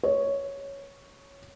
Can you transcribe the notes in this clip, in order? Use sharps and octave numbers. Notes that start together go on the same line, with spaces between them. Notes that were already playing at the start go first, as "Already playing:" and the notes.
C#5